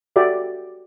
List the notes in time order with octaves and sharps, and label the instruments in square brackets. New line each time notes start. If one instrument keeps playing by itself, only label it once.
[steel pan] F#4 G4 A4 D5 E5